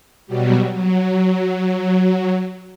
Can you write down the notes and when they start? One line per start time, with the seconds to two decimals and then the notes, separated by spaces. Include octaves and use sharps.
0.27 B2 F#3 G3
0.72 F#3